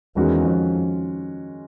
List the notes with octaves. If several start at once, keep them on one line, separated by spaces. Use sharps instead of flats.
E2 D#3 G#3 C#4 F#4
F2